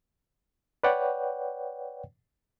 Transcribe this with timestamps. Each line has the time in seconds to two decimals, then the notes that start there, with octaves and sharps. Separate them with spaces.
0.84 B4 C#5 D5 F#5 G5